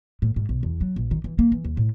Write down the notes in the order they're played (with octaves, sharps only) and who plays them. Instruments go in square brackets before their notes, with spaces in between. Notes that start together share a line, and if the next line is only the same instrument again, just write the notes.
[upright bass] A2
G#2
B1
E2
F#3
A#1
D#3
E3
A#3
E3
D#2
A2